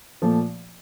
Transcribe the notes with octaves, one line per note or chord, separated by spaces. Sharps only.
A#2 F3 A3